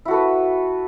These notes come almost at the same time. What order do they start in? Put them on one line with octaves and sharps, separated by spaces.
E4 F#4 A4 B4